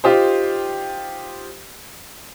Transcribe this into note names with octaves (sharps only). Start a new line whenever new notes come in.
D#4 F4 G4 C5